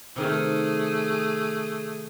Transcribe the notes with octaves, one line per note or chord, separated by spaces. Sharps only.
C3 D#3 A3 G#4